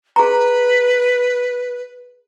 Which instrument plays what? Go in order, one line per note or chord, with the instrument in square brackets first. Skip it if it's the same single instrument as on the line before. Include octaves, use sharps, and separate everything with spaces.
[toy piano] G#4 A#5 [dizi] B4